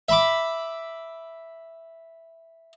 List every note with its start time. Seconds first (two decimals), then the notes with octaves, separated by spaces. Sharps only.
0.09 E5 B5 D6